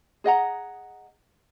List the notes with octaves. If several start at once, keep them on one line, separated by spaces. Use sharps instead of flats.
G#4 D#5 F#5 A#5